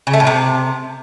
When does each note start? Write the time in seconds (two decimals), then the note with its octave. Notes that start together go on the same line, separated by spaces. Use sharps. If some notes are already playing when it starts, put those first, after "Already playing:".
0.07 C#3
0.13 A3
0.20 A2
0.27 C3